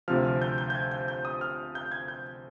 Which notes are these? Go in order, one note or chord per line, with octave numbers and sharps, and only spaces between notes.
D2 C3 F3 F6
F6
G6
G6
G6
G#6
G6
G6
D#6
F6
G6
G#6
G6